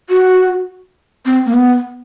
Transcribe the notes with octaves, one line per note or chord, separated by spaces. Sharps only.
F#4
C4
A#3
B3